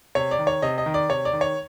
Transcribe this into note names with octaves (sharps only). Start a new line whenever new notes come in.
C3 C#5
D5
D#3
C#5
C3 D#5
D#5
D#3
D5
C3 C#5
D5
D#3
C#5